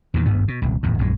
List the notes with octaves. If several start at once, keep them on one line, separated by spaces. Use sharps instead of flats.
E2 A#2 D#3
G#1 D2 G2 B3
B2
D#1 C2
D1 E2 A2
A#1 F#2 G#3